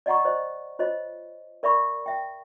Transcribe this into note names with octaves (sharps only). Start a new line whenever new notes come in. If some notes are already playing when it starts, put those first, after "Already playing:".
D5 D#5 F#5 A#5 C#6
C5 D5 D#5
F4 C5 C#5 D#5
A#4 D5 E5 B5 C#6
E5 G5